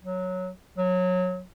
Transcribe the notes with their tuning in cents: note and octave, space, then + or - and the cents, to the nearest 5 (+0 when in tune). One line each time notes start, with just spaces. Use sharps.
F#3 -5
F#3 -20